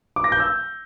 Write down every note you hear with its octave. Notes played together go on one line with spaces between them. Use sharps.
D6
A#6
G6
E6